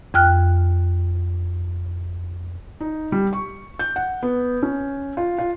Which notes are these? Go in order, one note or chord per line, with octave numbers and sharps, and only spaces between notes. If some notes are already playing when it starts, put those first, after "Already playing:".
F2 G5 F6 F#6
D#4
G3
C#6
G6
F#5
B3
C#4
F4
F4